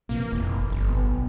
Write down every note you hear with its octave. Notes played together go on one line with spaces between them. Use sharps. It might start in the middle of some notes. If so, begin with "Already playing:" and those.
A#1 C3 E3 A#3
F1
G1
B1 B3